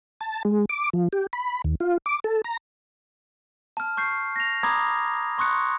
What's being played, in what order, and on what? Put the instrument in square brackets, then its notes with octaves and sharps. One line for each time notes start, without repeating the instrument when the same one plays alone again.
[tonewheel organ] A5
G#3
D6
F3
G4
B5
D#2
F4
D6
A4
A#5
[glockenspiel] A5 F6
C#6 G6 C7
A#6 F7
A#5 B5 D6 D#6 G#6
C6 C#6 D#6 F#6 C#7